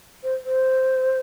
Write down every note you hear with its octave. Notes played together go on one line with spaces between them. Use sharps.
C5
C5